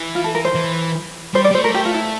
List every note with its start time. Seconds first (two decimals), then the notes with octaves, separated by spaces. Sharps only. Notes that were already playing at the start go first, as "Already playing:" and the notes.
Already playing: E3
0.15 F4
0.24 A4
0.35 A#4
0.45 C5
0.55 E3
1.34 G3 C5
1.45 D5
1.51 G3
1.55 A3 C5
1.64 A#4
1.74 G4
1.85 F4
1.94 E4